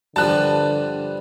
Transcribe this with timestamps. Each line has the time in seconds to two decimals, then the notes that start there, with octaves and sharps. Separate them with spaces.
0.16 G2 D3 F3 G3 A5 F#6